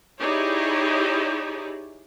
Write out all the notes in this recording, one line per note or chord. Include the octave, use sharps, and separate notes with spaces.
D#4 E4 G4 G#4 C#5 D5